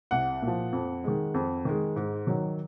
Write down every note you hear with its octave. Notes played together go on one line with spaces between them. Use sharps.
C2 F#5
A#2
F3
F2
D#3 G#3
F2
D#3 G#3
G#2
D#3 F#3